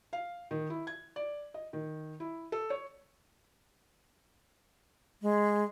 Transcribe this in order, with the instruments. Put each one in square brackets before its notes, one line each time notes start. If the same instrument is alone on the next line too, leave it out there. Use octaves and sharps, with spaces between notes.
[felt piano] F5
D#3
E4
G#6
D5
D#5
D#3
E4
A4
C#5
[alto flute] G#3